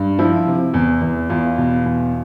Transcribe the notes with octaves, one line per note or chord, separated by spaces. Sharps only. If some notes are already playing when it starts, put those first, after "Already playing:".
Already playing: G2
F3 E4
C3
E2
E2
E2 F4
B2
E2